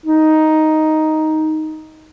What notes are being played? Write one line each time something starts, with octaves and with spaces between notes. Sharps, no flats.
D#4